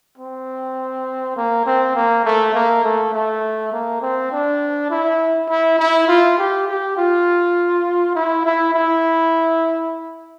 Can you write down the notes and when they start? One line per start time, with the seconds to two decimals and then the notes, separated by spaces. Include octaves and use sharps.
0.18 C4
1.37 A#3
1.66 C4
1.95 A#3
2.25 A3
2.54 A#3
2.84 A3
3.14 A3
3.73 A#3
4.02 C4
4.32 D4
4.91 E4
5.49 E4
5.79 E4
6.08 F4
6.38 G4
6.68 G4
6.97 F4
8.15 E4
8.45 E4
8.74 E4